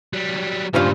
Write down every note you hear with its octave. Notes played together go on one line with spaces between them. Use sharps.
F#3 G3
G2 A#2 C#3 F3 C#4 F4